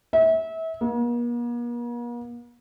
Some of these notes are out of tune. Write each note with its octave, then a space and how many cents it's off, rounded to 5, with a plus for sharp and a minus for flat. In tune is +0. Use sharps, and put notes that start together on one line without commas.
E5 -30
A#3 +45